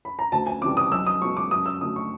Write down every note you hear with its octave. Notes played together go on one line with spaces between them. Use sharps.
B5
A#5
D2 A5
G#5
C3 E3 G3 D6
D#6
B1 E6
D#6
B2 G#3 C#6
D6
F#2 D#6
E6
D3 F#3 A3 D#6
C#6